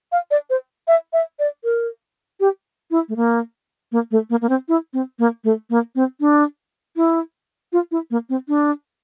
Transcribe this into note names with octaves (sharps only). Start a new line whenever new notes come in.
F5
D5
C5
E5
E5
D5
A#4
G4
E4
A3
A#3
A#3
A3
A#3
A#3
C4
E4
C4
A#3
A3
A#3
C4
D4
E4
F4
E4
A#3
C4
D4